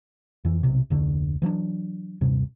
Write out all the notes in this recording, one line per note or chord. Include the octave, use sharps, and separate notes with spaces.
F2 E3
B1 C3
F1 D2 D3
E3 F#3 C#4 D4
D#1 G2 C3